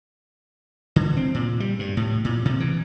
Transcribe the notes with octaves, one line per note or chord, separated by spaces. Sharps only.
D3
C4
A#2
G3
G2
A2
A#2
C3
E3